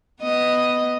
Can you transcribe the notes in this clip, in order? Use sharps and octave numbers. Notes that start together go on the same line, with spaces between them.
B3 D#5